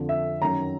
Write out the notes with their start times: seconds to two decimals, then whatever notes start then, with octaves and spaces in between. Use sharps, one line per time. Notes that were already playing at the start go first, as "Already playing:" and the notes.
Already playing: F2 D3 F3
0.09 E5
0.41 F#2 D#3 F#3 A#5